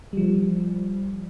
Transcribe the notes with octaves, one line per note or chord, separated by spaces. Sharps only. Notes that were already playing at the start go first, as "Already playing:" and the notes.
F3 G3